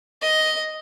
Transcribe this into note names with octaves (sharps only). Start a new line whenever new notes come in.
D#5